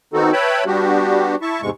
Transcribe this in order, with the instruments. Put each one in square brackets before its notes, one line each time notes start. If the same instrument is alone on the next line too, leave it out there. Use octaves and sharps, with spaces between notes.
[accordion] D#3 B3 C4 D#4 F#4 A4
B4 C#5 E5 G5 A5 B5
G3 B3 D4 F#4 G4
E4 E5 A5 C#6
E2 G#2 C3 G#3 C#6